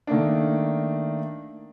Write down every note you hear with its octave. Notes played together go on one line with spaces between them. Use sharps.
D#3 A3 A#3 D4